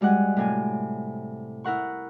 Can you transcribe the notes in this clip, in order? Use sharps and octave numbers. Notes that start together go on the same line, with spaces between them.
F#2 G3 G#3 F#5 G#5
A2 C3 G#5
E4 A#4 F#5 C#6